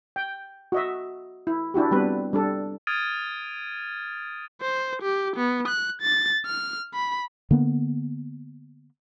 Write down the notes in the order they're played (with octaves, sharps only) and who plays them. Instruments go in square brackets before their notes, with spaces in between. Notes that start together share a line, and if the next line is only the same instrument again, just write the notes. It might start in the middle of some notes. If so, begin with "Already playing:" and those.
[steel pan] G5
F#4 D#5 E5
E4
D4 E4 F#4 G4
G3 B3 C4 D4 B4
G3 D4 A4
[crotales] D#6 F6 G#6 A6 D7 D#7
[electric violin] C5
G4
B3
F#6
A6
F6
B5
[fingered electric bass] D3 A#3 B3